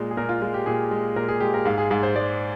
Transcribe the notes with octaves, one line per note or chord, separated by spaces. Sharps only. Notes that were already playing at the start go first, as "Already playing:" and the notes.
Already playing: A#2 G#3
G#4
A#2 A#4
F4
G#3 F4
G4
A#2 G#4
G#3
A#2 A#4
G#4
G#3 G4
A#4
G#2 F5
G#4
G#2 G#4
C5
G#3 D5